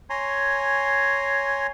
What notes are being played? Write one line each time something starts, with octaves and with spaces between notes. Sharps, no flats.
C#5 G#5 A#5 C6